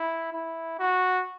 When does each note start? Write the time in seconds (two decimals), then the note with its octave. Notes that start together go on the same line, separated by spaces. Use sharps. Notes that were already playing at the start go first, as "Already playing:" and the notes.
Already playing: E4
0.32 E4
0.79 F#4